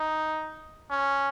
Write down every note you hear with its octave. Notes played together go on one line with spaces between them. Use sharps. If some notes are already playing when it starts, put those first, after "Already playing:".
Already playing: D#4
C#4